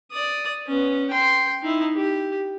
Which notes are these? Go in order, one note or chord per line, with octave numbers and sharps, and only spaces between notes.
D5 D#6
B3 C#4
G5 C6
D#4 E4
G4